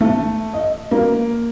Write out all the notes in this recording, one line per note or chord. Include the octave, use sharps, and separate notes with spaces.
A3
D#5
A#3